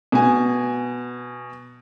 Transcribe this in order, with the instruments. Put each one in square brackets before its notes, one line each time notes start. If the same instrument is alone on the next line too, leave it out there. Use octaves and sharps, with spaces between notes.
[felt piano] B2 G#5